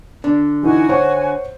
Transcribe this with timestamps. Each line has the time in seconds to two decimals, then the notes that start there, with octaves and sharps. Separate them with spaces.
0.24 D3 D4
0.63 E3 D#4 F#4 G#5
0.89 C5 C#5 F#5 C#6